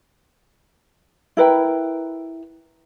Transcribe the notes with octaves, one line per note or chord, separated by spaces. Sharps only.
E4 A#4 B4 G5